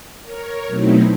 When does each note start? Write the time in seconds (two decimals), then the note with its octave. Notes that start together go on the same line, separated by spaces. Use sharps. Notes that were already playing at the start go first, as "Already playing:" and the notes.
0.22 A#4 C#5
0.67 B2 F#3 A3 C4 D#4 E4